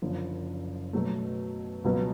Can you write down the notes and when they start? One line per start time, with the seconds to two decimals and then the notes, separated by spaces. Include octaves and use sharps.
0.02 F#1 F#2 D3 F3
0.93 B2 F#3 A3
1.84 C#2 B2 F#3 B3